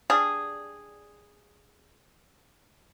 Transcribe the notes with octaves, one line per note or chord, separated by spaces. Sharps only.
G3 D4 G#4